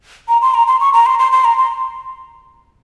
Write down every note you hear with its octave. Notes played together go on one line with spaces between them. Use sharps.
A#5
C6
A#5
C6
C#6
A#5
C6
C6
C6
A#5
C6